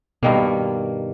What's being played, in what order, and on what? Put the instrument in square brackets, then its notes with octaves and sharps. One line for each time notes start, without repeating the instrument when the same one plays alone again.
[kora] G2 D#3 A#3 [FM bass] B2